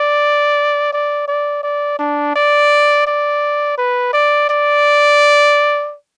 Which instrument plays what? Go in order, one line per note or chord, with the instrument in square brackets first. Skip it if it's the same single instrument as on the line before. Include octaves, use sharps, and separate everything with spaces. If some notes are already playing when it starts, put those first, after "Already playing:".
Already playing: [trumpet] D5
D5
D5
D5
D4
D5
D5
B4
D5
D5